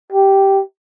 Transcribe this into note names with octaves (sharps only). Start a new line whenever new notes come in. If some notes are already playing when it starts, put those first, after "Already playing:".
G4